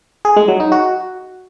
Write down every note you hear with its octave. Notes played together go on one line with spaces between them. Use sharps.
G#4
G#3
F#3
D#4
F#4